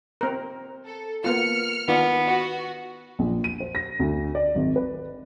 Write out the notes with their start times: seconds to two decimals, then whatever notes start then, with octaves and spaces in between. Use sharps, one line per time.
0.21 C4 A#4
0.85 A4
1.24 A#3 B3 F4 F6 C#7
1.88 D#3 B3 D4 F4
2.26 F#4
3.19 A#1
3.44 D#7
3.60 C5
3.75 A#6
3.99 D2
4.35 D5
4.55 G#1
4.76 B4